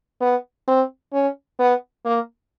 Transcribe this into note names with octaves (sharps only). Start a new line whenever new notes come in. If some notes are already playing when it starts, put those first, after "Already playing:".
B3
C4
C#4
B3
A#3